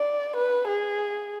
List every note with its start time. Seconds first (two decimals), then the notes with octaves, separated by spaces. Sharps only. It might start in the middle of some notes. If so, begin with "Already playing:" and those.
Already playing: D5
0.36 B4
0.68 G#4